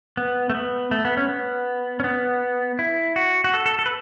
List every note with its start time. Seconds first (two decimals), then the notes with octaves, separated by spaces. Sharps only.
0.17 B3
0.50 A3
0.55 B3
0.91 A3
1.05 B3
1.17 C#4
1.29 B3
2.00 C#4
2.04 B3
2.79 E4
3.16 F#4
3.44 F#4
3.54 A4
3.66 A4
3.79 A4
3.86 B4